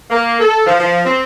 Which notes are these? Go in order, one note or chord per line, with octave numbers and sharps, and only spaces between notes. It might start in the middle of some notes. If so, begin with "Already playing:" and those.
A#3
A4
F3
F3
C4